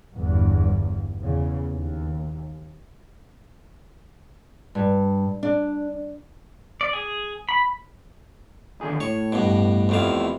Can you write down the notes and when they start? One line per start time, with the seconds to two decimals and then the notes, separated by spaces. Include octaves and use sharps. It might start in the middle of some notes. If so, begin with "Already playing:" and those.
0.13 G1 E2 G2
1.19 E2 C#3
1.69 D#2
4.75 G2
5.43 D4
6.81 D5
6.93 G#4
7.49 B5
8.81 D#2 D3 G#4
9.00 A2 C#5
9.32 G2 B2
9.89 F2 C3 A3 B3 E4 F5